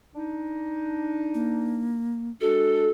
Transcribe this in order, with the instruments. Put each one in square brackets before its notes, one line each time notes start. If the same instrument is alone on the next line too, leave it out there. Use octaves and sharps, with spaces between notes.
[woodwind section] D4 D#4
[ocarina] A#3
[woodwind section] G#3 D4 [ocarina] F#4 [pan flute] A4